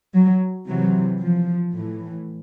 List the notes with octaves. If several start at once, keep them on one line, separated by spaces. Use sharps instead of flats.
F#3
C3 E3 F#3
F3
A2 E3